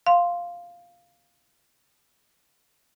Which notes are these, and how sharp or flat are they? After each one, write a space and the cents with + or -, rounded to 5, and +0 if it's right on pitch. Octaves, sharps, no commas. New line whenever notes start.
F5 +0 C6 +0